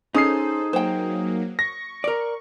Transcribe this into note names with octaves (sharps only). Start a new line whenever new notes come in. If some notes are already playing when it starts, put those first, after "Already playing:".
C#4 D#4 G#4 A4 C5 D#6 C7
F#3 A#3 C5 G5
C#6 A#6
A#4 D5